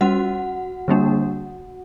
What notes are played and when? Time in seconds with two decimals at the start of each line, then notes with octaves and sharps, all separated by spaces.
0.01 G3 C#4 F#4 F#5
0.88 D3 G3 A#3 D4